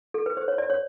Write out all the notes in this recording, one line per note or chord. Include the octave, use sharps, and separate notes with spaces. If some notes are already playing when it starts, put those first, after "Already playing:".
A4
B4
C5
C#5
D5
C#5